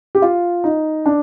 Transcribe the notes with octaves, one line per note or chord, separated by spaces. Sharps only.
G4
F4
D#4
D4